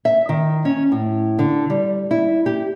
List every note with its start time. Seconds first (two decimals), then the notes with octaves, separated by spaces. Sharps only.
0.05 E5
0.29 D#3
0.65 C#4
0.92 A2
1.39 D3
1.70 G3
2.11 E4
2.46 G4